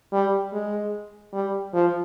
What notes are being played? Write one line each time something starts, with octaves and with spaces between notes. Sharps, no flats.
G3
G#3
G3
F3